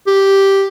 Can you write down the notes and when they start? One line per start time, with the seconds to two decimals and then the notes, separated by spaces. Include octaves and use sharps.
0.07 G4